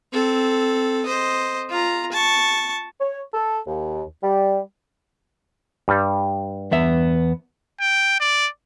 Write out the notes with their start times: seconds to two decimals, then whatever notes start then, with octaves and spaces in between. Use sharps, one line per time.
0.13 C4 A4
1.05 C5 D#5
1.69 F4 A#5
2.12 A5 C#6
2.99 C#5
3.33 A4
3.66 D#2
4.23 G3
5.88 G2 G3
6.71 E2 B3 E5
7.81 G5
8.20 D5